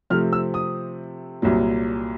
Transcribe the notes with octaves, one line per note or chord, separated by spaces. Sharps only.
C3 F3 A3 C4 F6
E6
D#6
C2 A#2 F#3